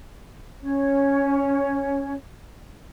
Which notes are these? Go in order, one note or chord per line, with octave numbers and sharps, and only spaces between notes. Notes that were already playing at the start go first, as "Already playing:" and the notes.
C#4 C#5